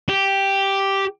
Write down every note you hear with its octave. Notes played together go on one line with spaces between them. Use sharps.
G4